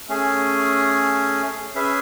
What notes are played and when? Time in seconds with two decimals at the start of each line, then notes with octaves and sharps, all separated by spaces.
0.09 A3 C#4 G#4
1.75 C#4 G#4 B4 E5